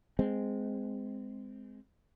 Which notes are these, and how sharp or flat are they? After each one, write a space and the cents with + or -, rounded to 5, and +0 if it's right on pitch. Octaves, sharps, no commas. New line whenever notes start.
G#3 +0 C4 -20